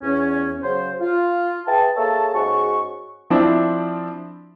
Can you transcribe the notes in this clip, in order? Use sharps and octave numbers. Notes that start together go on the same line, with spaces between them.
E2 C#4
C#3 F#3 C5
F4
G#4 B4 E5 G5 A5
A#3 G#4 A4 C#5 E5 A5
G#2 C#4 F#4 G#4 C#6
F3 C4 D4 E4